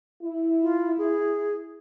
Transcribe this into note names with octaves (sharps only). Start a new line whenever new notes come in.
E4
F4
G#4